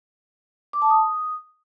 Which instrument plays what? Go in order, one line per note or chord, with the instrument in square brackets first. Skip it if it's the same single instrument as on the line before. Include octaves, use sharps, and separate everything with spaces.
[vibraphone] D6
A5
D#6